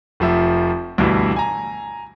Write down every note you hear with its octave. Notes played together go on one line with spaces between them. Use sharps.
F1 F3 E5
D2 G2 B2 E3
G#5 A#5